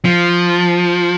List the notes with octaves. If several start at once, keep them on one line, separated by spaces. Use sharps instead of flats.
F3